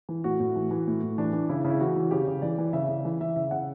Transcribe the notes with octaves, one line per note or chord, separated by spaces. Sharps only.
E3
A2 F#4
A2
E3
E3
A2
A2
E3 D4
E3
C#3 E4
C#3
E4
E3 F#4
E3
C#3 G4
C#3
E3 D5
E3
C#3 E5
C#3
E3
E3 E5
C#3 E5
C#3 F#5